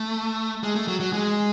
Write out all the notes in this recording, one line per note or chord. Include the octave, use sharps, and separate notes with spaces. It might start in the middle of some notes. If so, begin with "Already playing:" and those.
Already playing: A3
G#3
A3
F#3
F#3
G#3